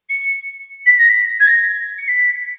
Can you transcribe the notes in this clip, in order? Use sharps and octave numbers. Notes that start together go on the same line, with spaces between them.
C#7
B6
A#6
B6
G#6
A#6
C#7
B6